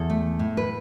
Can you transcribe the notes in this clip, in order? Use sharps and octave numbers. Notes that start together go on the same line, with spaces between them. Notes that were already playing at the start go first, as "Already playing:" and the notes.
Already playing: E2 A4
A3
A2
B4